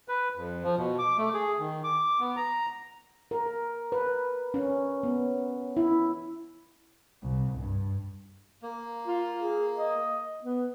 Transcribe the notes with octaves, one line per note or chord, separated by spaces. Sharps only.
B4
F2
F3
B2
D6
A3
G#4
D#3
D6
B3
A#5
A#4
B4
C#4
B3
E4
C2
G2
A#3
F4
G#4
D#5
B3